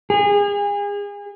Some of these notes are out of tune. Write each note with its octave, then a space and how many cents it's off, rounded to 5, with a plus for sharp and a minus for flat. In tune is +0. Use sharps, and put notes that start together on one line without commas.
G#4 -35